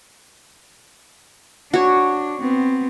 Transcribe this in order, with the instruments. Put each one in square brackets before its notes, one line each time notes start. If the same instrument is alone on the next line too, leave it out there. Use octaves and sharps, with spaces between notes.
[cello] D4 [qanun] F#4 C#5
[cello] B3 C4